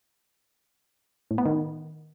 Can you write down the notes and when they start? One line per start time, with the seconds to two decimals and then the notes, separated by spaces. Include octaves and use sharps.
1.31 A2
1.38 B3
1.46 D#3